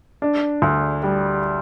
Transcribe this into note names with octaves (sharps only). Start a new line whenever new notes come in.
D4
D2
G3